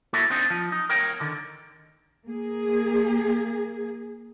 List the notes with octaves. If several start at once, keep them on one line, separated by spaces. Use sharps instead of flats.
A#3 E4 F#4 A4
C4 D4 D#4
F3
D#4
A#4 C#5 G5
D3 D#3
A#3 G#4